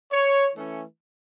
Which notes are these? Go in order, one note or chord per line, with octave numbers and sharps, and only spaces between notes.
C#5
E3 A3 C#4